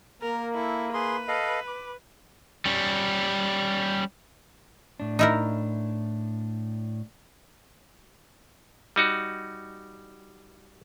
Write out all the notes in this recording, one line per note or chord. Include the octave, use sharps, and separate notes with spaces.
A#3 A#4
E4 A4
G#4 B4 C6
A4 D#5 F5
D6
G3 C#4
A2 D4
D#4 E4 A#4
G3 D#4 F#4